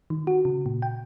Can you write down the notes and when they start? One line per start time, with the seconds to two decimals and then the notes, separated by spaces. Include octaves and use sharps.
0.10 D#3
0.27 F#4
0.45 C#3
0.66 A#2
0.82 G5